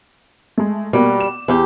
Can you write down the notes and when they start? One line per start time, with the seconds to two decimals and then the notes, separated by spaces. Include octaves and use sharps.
0.58 G#3 A3
0.93 B2 G3 A#3
1.20 E7
1.48 E2 G4